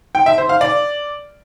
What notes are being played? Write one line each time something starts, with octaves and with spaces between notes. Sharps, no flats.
G5
E5
C5
F5
D5